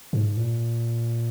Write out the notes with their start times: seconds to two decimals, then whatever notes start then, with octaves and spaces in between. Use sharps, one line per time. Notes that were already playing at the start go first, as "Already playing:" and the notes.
0.13 G#2
0.37 A#2